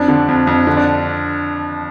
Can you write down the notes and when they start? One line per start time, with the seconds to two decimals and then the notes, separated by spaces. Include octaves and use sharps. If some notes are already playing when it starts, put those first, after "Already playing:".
Already playing: F2 D4
0.08 D3
0.28 F2
0.47 F2
0.67 D3
0.77 D4